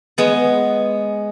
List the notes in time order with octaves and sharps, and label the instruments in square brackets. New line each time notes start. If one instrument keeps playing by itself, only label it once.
[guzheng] G#3 B3